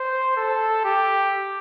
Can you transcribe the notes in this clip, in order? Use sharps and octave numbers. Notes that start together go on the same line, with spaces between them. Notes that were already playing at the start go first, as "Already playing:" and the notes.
Already playing: C5
A4
G4